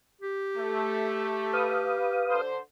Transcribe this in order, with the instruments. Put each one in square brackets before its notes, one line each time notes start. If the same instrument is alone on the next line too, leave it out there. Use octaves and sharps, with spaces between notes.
[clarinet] G4
[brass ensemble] A3
[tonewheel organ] B4 F5 D#6
[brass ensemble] D3 C5